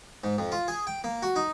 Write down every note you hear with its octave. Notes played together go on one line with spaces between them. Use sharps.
G#2
F2
F4
G#4
G5
A#3
F#4
D#4